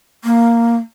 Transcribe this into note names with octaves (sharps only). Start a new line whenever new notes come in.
A#3